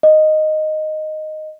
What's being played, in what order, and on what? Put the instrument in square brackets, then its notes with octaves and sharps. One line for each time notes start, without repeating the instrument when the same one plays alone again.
[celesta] D#5